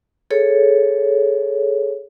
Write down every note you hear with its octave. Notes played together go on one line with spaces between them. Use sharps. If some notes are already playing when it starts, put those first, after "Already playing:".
G#4 A4 C#5